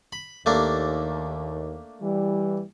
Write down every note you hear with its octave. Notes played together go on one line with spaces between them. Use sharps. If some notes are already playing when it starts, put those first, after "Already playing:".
B5
D#2 A3 A#3 D4
E3 G3